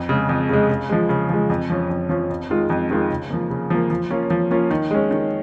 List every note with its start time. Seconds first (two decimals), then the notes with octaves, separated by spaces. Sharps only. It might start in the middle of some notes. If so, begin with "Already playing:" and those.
Already playing: F2
0.09 C#3 G#3
0.29 F2
0.49 C#3 G#3
0.69 C#3
0.89 F3 G#3
1.09 C#3
1.29 F3 G#3
1.50 F2
1.70 F3 C#4
1.90 F2
2.09 F3 C#4
2.30 F2
2.50 D#3 G#3 F4
2.70 F2
2.90 D#3 G#3 F4
3.10 C#3
3.30 F3 A#3
3.50 C#3
3.70 F3 A#3
3.90 F3
4.10 A#3 C#4 F4
4.30 F3
4.51 A#3 C#4 F4
4.71 D#3
4.91 G#3 C#4
5.11 D#3